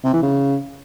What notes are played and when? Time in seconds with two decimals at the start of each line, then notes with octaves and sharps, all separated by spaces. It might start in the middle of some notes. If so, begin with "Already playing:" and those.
0.04 C3
0.13 E3
0.23 C#3